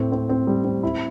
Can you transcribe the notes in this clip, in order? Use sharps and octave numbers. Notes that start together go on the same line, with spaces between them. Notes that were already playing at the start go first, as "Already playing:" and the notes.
Already playing: A2 C4
C4
C4
G3
C4
E4